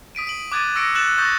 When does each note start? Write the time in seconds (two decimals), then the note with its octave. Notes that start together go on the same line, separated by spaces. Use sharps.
0.15 D#6 B6 D7 D#7
0.27 D7 F#7
0.52 D6 F#6 G#6 A6 D7 D#7
0.75 C#6 E6 A#6 C#7 D7
0.95 F#6 A6 C#7 E7 F#7
1.18 C#6 D#6 G6 A6 A#6